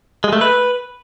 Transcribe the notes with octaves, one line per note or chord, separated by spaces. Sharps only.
G#3
A3
B4